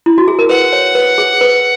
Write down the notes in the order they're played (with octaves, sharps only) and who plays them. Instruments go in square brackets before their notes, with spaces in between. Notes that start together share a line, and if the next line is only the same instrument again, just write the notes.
[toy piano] E4
F#4
G#4
A#4
[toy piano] B4 [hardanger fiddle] F#5
[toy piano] C#5
B4
G#4
B4